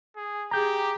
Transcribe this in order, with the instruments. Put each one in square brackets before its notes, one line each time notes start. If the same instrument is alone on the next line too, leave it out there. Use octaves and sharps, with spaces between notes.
[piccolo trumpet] G#4
[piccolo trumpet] G4 [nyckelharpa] G#4 [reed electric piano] A#5 G6